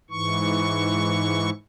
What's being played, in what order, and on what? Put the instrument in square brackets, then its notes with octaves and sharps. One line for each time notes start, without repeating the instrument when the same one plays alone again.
[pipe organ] G#2 E3 C#6